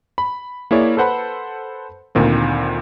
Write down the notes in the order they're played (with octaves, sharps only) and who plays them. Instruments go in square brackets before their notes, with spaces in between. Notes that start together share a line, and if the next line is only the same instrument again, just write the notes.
[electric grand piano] B5
A#3 E4 G#4 C#5 D5
A4 B4 C5 F#5 A5 B5
D2 A#2 D#3 C4